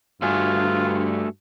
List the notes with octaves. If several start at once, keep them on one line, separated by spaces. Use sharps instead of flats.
G2 A3 F4 F#4 G#5